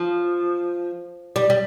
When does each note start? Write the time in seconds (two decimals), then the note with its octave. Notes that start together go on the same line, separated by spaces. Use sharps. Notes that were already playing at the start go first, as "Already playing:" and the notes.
Already playing: F3
1.36 G3
1.50 G3